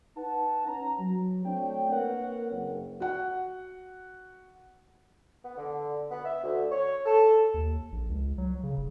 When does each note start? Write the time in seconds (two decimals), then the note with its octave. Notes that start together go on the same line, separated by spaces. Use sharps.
0.17 D#4 B4 F#5 A5
0.67 C#4 A#5
1.00 F#3
1.45 A3 C4 D4 F#4 C#5 G5
1.92 A#3 C4 A#4 B4 C#5 F#5
2.51 F#1
3.00 F#4 F#5
5.44 B3
5.57 D3
6.11 B3
6.25 E5
6.43 D2
6.72 C#5
7.06 A4
7.54 D#2
7.92 A#1
8.09 C#2
8.38 F#3
8.63 C#3
8.77 F1